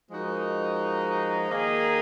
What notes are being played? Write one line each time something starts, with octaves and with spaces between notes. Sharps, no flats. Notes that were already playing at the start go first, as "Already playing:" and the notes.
F3 G#3 D#4 F#4 A#4
D#3 A#3 D#4 G#4